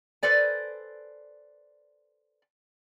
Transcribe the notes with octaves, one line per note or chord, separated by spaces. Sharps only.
A4 B4 C5 D5 G#5